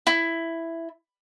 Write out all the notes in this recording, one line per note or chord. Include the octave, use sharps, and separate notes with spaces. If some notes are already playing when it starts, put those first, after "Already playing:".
E4